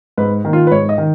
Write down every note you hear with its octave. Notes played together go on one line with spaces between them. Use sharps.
G#2 B4
D#3 A#3
F4
B4
G#2 C#5
D#5
D#3